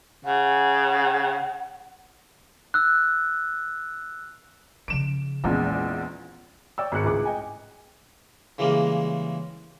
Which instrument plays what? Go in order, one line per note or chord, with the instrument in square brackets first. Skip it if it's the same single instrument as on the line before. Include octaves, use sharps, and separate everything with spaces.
[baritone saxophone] C#3 [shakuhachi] F#5
[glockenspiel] E6 F#6
[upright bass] C#3 F3 [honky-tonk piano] D7 E7
[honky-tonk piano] A#1 E2 G#3 [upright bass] C#4
[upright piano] C#5 D5 G5 E6
G#1 G#4 F#6 C#7
C#2 A2 G#4 D6
D#5 G5 G#5
[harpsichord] C#3 E3 G3 G#3 A#3